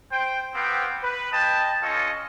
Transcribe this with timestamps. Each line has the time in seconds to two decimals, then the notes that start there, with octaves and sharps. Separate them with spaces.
0.12 C5 G5
0.55 B3 C4 G4 F5 G5
1.03 B4
1.32 B4 D#5 G5 A5
1.82 C#4 F4 A4 C#5 D#5